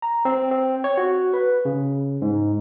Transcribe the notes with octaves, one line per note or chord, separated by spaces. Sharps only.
A#5
C4
C4
C#5
F#4
B4
C#3
G#2